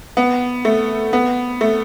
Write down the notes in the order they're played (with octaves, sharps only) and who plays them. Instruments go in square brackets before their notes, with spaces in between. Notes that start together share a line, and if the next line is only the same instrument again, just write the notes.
[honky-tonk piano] B3
A3
B3
A3